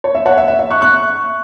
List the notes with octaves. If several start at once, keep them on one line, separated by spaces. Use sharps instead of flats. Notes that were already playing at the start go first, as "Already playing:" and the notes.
C#5
E5
C#5 F#5
E5
E5
E5
C#6 F#6
C#6 F#6